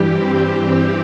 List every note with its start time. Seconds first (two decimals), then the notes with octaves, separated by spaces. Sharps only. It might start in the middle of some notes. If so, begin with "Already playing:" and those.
Already playing: G2 E3 G3 G4
0.13 C4